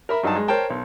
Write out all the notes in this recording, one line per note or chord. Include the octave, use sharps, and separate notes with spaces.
A#4 E5 B5
G2 F#3 D#4 F#4 A5
G#3
A#4 C5 C#5 G5 A5
B1